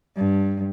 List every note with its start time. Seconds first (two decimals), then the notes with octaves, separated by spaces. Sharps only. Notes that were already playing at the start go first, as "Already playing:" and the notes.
0.17 G2